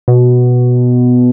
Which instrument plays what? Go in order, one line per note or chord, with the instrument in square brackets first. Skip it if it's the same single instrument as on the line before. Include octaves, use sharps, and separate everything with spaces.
[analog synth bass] B2